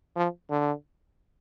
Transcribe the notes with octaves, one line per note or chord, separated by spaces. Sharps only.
F3
D3